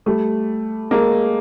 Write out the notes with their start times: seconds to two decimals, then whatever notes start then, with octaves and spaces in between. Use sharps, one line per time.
0.06 G3 A3
0.91 G#3 A#3